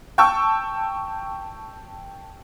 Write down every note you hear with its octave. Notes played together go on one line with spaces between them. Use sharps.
G5 A5 C#6 E6